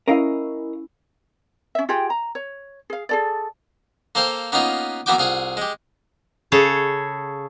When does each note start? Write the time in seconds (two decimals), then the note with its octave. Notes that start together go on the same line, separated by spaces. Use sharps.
0.08 C#4 E4 A#4 D#5 F5
1.75 C#4 E5
1.89 F4 G4 G#4 G5
2.10 A#5
2.35 C#5
2.90 G#4 F5
3.09 G#4 A4 D5
4.15 A#3 A4 C5 F5 G5
4.52 A#3 B3 C#4 D#4 F4 B4
5.06 E3 A#3 B3 F#4 G5 D6
5.18 C2 F4 G#4 F#5
5.57 G#3 G4
6.52 C#3 G#4 A4 C#5